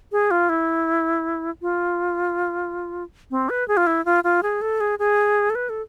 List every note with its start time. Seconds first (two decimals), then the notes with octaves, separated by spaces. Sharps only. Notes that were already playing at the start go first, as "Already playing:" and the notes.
0.12 G#4
0.31 F4
0.49 E4
1.62 F4
3.31 C4
3.49 B4
3.68 G#4
3.77 F4
3.87 E4
4.05 F4
4.24 F4
4.43 G#4
4.61 A4
4.80 G#4
4.99 G#4
5.50 A4
5.55 B4
5.69 A4